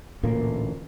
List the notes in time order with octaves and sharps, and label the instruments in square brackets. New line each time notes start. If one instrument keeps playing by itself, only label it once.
[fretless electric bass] A1 D2 A#2 A#3